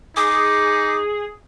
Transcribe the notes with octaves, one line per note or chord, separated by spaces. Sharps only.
D#4 G#4 D6